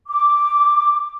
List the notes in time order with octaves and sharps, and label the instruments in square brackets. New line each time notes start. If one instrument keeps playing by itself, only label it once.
[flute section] D6